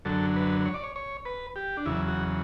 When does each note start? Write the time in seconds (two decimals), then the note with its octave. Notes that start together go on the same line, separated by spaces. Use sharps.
0.05 F#2 D3 F#3 A4
0.36 B4
0.66 C#5
0.74 D5
0.83 C#5
0.96 C#5
1.25 B4
1.56 G4
1.77 D4
1.86 E2 C#3 F#3 E4
2.08 F#4